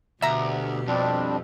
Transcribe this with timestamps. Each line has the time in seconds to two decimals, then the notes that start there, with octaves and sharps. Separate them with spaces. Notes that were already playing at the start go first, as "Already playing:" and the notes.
0.22 D2 B2 G4 E5 A#5
0.87 F2 G3 C4 D4